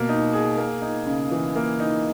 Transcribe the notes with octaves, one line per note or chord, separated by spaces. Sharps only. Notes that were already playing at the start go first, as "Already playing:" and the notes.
Already playing: B2 A#3
D#4
G#4
A#3
D#4
C#3
E3
A#3
D#4